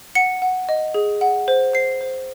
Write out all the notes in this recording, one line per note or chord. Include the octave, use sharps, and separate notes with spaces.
F#5 C#7
F#5
D#5
G#4
F#5
C5
C5 C7
C5